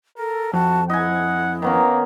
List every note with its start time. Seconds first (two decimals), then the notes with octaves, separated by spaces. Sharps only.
0.18 A4 A#4
0.53 F2 F#4 A5
0.90 E4 D#5 F#5 G#5
1.62 D#3 A#3 B3 C#4